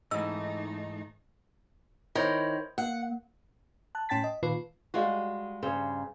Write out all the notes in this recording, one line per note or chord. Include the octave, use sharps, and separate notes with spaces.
G#2 E3 A3 D#4 D#5 E6
D#3 E4 C5 C#5
A#3 F#5
A5 F#6
A2 C#4 G5 A5 A6 B6
D#5
A#2 D#3 F4 B4 C7
G3 G#3 F4 F#4
G2 C#3 C5